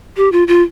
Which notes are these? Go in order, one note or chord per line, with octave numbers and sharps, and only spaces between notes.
G4
F4
F4